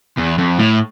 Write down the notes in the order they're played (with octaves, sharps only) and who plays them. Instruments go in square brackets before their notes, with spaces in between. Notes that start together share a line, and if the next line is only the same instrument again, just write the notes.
[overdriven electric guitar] E2
F2
A2